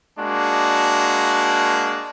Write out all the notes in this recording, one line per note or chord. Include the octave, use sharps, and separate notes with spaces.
G#3 A#3 D4 F#4